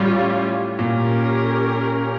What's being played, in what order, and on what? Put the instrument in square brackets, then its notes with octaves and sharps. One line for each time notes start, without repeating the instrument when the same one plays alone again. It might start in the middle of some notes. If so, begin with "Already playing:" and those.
Already playing: [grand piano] A2 [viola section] G3 C#4 F4
[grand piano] A#2 [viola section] C#4 G4 A#4